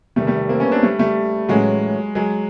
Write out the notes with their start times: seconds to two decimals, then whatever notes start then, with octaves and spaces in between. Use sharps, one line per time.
0.16 E2 C3 D#3 G3 A3
0.27 G3 A3
0.49 A#3 C4
0.60 B3 C#4
0.72 C4 D4
0.83 G3 A3
0.99 G3 A3
1.49 A2 E3 F#3 G#3 A3 C#4 F#4
2.15 F#3 G#3